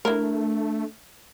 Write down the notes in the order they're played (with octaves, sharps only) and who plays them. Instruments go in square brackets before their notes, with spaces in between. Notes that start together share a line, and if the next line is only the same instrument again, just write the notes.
[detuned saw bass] A3 [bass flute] D4 [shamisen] E4 A#4